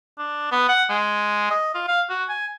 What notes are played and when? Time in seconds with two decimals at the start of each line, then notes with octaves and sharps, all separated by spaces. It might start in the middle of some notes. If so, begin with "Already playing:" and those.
0.18 D4
0.52 B3
0.69 F#5
0.90 G#3
1.51 D#5
1.74 F4
1.88 F5
2.09 F#4
2.29 G#5